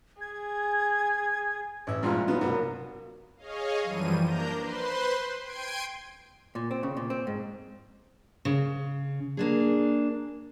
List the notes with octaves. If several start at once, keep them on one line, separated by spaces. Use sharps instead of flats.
G#4 G#6
A1 E5
G2 A#2 F3 G#3 C4 F4
F#3 B3 D#4 F4
C2 B2 F#3 A#3 B3
G#4 C#5 D#5 F5
F#2 E3 F3 G3 D#7
A#3 D4 A#4 A#5 G6
B4 C5 C6
G5 C6 G#6 C7 D7 D#7
A#2
C4
C#3
A#2
C4
G#2
C#3
A#3 D4 G#4